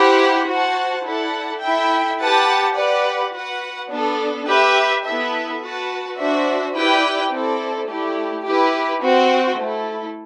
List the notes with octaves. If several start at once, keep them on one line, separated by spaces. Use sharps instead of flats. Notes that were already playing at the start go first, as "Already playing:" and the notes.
Already playing: E4 G4 C5 F#5
F#4 C5 F#5 A5
E4 A4 D5 F#5 A5
E4 A4 E5 G5
G4 B4 F#5 A5
G4 B4 D5 F#5
F#4 B4 F#5
B3 D4 A4
G4 B4 E5
B3 E4 A4 E5
F#4 B4 F#5 A5
D4 F#4 C5 E5
E4 G4 B4 D5 G5
C4 E4 A4 D5
A3 E4 G4 D5
E4 G4 B4
C4 F#4 C5 G5
A3 E4 A4